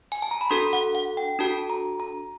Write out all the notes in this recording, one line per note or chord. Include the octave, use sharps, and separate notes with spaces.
G#5
A5
A#5
B5
D4 F#4 A4 C6
F#5
F#5
G5
D4 F#4 A4 A5
A#5
A#5